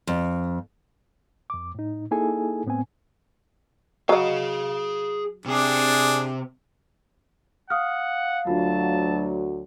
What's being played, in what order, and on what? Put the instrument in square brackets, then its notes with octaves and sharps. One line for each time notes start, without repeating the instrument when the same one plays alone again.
[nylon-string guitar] F2
[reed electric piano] F2 D6
A2 D#4
A#3 D#4 E4 G#4 A4 G#5
A2 B3 C4 G#5
[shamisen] F#3 D#5 [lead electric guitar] G#4 F5
[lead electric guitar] C3 C4 [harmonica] D4 G#4
[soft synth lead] F5 [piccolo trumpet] F#5 [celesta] D#6 F6
[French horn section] D2 F#3 [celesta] D4 F4 [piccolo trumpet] A5